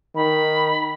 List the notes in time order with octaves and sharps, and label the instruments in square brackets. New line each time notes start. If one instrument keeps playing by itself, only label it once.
[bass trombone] D#3 [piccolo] B5